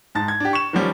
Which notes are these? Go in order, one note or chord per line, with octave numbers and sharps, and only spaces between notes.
G#2 A5 A6
G#6
D4 G4
C#6 E7
D#3 F3 G3 C#4